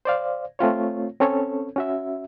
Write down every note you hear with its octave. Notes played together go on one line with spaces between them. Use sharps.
C5 D5 F5
A3 C4 F4 C#5
C4 C#4 A4 C#5
C#4 F#4 E5